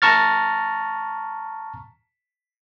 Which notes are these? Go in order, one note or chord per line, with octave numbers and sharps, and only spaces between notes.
A5 A#5 C#6 F6 A6